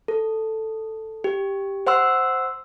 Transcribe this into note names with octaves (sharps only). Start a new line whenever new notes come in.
A4
G4
C5 F#5 C6 E6